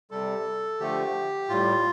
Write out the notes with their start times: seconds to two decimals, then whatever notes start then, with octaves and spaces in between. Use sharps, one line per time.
0.11 C3 G3 A4
0.80 D3 F3 A3 G4
1.49 A2 G3 F4